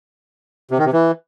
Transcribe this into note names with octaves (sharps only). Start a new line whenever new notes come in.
C3
D#3
C3
E3